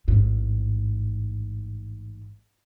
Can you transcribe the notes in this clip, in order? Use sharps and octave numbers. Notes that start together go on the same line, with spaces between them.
A1 G#2